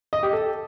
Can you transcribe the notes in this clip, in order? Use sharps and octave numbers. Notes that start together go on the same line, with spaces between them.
D#5
G4
A4